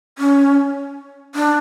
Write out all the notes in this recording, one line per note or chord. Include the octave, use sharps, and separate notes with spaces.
C#4
D4